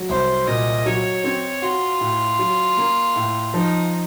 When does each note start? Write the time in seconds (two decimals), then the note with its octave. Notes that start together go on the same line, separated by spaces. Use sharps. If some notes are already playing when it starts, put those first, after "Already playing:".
Already playing: F#3
0.09 C2 C5
0.47 A#2 D#5
0.86 F#3 C#5
1.24 C4 C#5
1.62 F4 F#4
2.00 A2
2.39 F#3
2.77 A#3
3.16 A2
3.54 F3 D#4